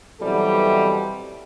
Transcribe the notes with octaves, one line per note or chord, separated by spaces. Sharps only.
B2 E3 F#3 G3 C4 A4